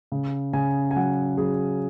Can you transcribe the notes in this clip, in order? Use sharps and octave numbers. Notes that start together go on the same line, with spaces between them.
C#3
C#3 G#5
G#5
F#3 F#5
F#3 G#4